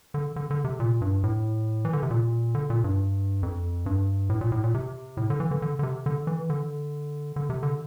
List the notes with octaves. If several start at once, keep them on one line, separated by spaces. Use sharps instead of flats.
D3
D3
D3
C3
A#2
G2
A2
E3
D3
C3
A#2
D3
A#2
G2
F2
G2
A2
A#2
A2
A#2
C3
A2
D3
E3
D3
D3
D3
C3
D3
E3
D3
D3
C3
D3